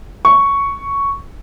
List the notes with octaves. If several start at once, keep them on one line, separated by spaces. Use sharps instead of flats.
C#6